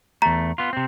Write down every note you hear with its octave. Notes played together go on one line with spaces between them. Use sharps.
E2 A3 A#5
B3 F4
C3 C4